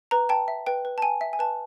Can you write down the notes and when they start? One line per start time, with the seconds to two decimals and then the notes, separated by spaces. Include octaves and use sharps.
0.11 B4 A#5
0.29 G5 A5
0.48 E5
0.66 B4 G5
0.85 B4
0.98 A5
1.02 G5 G#5
1.21 E5
1.33 G#5
1.39 B4 A5